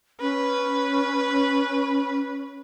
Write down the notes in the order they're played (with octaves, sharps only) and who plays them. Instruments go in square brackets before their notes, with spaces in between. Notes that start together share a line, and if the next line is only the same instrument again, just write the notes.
[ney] C#4 [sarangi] B4